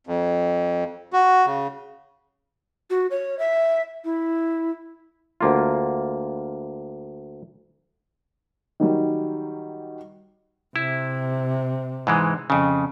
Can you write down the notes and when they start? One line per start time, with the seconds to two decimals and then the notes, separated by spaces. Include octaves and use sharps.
0.07 F2
1.13 F#4
1.46 C#3
2.90 F#4
3.11 C#5
3.39 E5
4.05 E4
5.41 D2 A#3 F4
8.80 D#3 F#3 G3
10.76 C3 E4
12.07 G#2 E3 G#3
12.50 F2 C#3